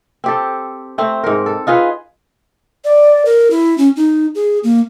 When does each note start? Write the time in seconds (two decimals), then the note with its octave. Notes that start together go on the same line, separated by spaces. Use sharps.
0.24 C4 G4 A4
0.98 A3 C4
1.24 G#2 A#4
1.46 A4
1.67 D#4 F4 G#4 B4
2.84 D5
3.25 A#4
3.51 E4
3.78 C#4
3.96 D#4
4.35 G#4
4.64 A#3